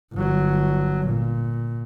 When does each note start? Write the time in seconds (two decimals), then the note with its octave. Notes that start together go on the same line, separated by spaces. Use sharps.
0.13 G1 F#3
1.07 A#2